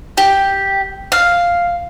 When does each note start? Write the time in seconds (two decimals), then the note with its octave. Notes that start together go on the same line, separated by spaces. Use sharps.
0.17 G4
1.12 F5